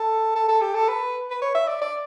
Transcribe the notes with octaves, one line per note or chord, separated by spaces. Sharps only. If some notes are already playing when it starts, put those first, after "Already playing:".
Already playing: A4
A4
A4
G4
A4
B4
B4
C#5
E5
D5
D5